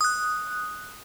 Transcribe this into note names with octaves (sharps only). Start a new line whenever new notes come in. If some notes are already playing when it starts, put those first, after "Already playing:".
D#6 F#6